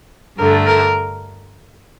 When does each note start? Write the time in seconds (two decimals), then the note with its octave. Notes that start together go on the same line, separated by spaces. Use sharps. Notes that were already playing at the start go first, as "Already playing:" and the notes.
0.38 G2 D3 A3 A#4
0.66 A#4